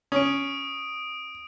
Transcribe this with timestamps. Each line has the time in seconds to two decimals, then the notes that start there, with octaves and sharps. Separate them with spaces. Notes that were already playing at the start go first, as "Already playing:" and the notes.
0.12 C#4 D#6 D7